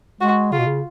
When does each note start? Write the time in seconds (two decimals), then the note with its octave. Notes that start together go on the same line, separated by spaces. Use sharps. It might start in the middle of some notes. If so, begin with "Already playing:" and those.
0.21 G#3 F#4
0.52 C#3 F4
0.59 B2
0.66 C#3